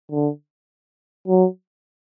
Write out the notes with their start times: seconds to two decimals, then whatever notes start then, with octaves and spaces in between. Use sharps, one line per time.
0.11 D3
1.28 F#3